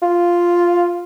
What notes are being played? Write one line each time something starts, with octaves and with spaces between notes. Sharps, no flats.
F4